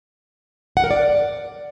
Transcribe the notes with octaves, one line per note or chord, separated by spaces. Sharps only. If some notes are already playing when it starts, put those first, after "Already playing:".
F#5
A#4
D5